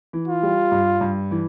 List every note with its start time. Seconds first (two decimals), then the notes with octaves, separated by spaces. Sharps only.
0.13 E3
0.28 F4
0.43 G3
0.72 G2
1.01 G2
1.31 E3